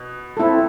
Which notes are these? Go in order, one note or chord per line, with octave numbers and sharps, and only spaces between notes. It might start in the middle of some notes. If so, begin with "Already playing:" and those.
Already playing: B2
C4 E4 A4